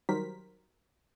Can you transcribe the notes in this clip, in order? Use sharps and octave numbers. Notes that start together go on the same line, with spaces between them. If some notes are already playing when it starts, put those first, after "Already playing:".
D#3 F#3 G3 A#4 C5 B6